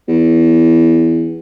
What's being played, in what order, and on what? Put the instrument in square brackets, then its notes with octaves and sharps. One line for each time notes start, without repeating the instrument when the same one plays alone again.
[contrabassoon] E2